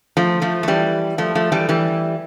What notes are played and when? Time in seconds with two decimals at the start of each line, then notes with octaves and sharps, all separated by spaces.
0.17 F3 A3
0.41 F3 A3
0.63 A3
0.68 E3 G3
1.18 F3 A3
1.35 F3 A3
1.52 E3 G3
1.69 E3 G3